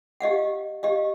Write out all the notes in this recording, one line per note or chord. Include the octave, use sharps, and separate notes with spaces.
G4 D#5 F5 F#5
G4 D#5 F5